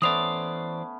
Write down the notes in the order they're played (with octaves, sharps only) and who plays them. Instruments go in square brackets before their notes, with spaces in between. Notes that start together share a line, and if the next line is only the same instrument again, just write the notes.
[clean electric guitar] E3 C5 D5 [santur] A3 B3 C#4 [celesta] D#6 F7